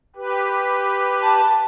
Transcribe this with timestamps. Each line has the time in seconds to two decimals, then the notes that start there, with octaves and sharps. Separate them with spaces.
0.16 G4 B4
1.22 A5